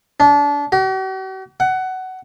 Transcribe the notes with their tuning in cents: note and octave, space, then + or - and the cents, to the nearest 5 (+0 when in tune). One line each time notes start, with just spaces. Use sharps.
D4 -30
F#4 +45
F#5 +15